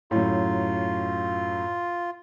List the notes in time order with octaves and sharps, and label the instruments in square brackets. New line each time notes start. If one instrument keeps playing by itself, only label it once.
[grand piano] F#2 A2 [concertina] F4